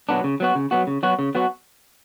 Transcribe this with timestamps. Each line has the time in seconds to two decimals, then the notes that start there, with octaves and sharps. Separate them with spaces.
0.09 B2 F#3 B3 D4
0.24 C#3
0.40 F#3 B3 F#4
0.55 C#3
0.71 F#3 B3 F#4
0.87 C#3
1.03 F#3 B3 F#4
1.19 C#3
1.35 F#3 B3 F#4